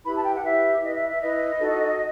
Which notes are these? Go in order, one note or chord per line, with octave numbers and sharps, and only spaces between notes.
E4 G4 B4 B5
A5
G5
F#5
E4 G4 B4 E5
E4 B4 D#5
E5
E5
E4 B4 D#5
D#4 F#4 A4